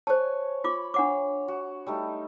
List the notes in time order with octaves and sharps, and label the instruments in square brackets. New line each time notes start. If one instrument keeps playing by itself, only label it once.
[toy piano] C5 A5 [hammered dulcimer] C#5 G#5
[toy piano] F4 D6 [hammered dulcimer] B5
[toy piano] D4 F#5 D6 [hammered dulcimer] C#5
[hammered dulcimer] F#4
G3 A3 D#4